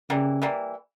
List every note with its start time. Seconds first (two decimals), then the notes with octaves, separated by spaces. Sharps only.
0.10 C#3 E3 G3 A#3
0.42 E3 G3 A#3